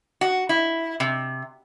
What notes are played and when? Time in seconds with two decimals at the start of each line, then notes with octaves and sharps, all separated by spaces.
0.21 F#4
0.49 E4
1.00 C3